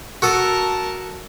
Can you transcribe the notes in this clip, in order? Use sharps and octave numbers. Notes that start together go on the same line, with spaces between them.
F#4 A4 A#4 A5 D#6